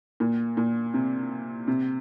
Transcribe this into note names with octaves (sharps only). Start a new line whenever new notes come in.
A#2
A#2
C3
C3